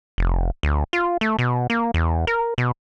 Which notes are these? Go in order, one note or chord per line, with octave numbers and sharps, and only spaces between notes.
F1
D2
F4
A3
B2
A#3
E2
A#4
B2